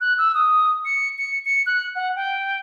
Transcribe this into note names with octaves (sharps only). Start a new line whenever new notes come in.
F#6
E6
D#6
C#7
C#7
C#7
F#6
F#5
G5